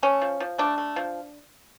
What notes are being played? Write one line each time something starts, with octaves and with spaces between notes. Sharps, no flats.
A3 C#4
F3
F3
A3 D4
A3
F3